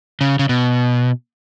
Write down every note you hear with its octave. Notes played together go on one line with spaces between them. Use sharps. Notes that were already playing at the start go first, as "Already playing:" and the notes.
C#3
C#3
B2